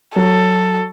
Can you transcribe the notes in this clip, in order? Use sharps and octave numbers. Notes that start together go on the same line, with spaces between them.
F#3 A4